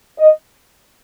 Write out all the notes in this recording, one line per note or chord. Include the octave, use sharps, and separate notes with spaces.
D#5